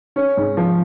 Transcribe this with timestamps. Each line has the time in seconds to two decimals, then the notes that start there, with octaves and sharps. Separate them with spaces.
0.16 C#4
0.37 G#2
0.57 F3